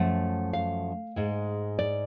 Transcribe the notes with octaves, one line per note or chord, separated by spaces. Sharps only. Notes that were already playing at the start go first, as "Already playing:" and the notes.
Already playing: F#2 F3 A3 F#5
F5
G#2 G#3
D5